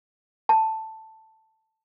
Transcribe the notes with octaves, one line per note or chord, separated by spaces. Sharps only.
A5